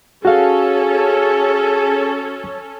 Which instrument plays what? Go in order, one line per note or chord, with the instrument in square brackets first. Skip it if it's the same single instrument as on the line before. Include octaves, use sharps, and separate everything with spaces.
[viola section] C#4 A4 [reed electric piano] F#4 F5 [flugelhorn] G#4